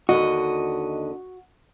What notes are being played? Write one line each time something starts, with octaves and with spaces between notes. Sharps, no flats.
D#2 D3 F#4 D#5